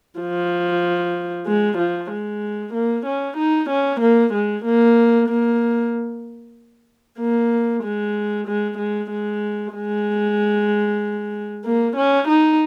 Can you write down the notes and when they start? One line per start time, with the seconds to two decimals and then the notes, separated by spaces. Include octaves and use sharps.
0.19 F3
1.46 G#3
1.78 F3
2.11 G#3
2.73 A#3
3.06 C#4
3.37 D#4
3.70 C#4
4.00 A#3
4.33 G#3
4.65 A#3
5.28 A#3
7.19 A#3
7.83 G#3
8.47 G#3
8.78 G#3
9.10 G#3
9.74 G#3
11.65 A#3
11.96 C#4
12.28 D#4